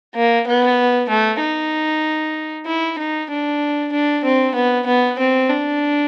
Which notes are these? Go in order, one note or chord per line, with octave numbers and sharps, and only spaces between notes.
A#3
B3
A3
D#4
E4
D#4
D4
D4
C4
B3
B3
C4
D4